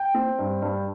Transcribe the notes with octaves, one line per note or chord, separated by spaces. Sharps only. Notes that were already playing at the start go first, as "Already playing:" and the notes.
Already playing: G5
C4
G2
G2